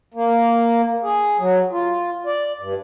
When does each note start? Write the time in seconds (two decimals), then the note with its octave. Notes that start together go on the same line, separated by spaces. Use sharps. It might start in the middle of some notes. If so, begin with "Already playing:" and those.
0.14 A#3
1.03 G#4
1.38 F#3
1.72 F4
2.26 D5
2.59 G2